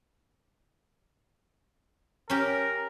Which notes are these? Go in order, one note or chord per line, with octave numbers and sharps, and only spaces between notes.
C#4 G4 A#4